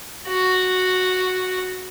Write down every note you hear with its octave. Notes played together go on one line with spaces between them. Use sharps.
F#4